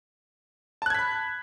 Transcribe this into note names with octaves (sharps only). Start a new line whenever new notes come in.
A5 B5 F#6 G#6 B6